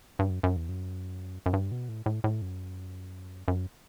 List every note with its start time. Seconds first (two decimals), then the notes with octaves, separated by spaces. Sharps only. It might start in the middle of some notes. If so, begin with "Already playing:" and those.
0.19 G2
0.30 F#2
0.43 F#2
0.57 E2
0.69 F#2
1.46 F#2
1.53 G2
1.72 B2
1.89 A2
2.06 A2
2.24 A2
2.42 F#2
3.48 F#2